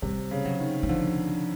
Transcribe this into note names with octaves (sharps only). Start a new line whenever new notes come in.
C3 G3
C#3
F#3
D#3
F#3
D3 F3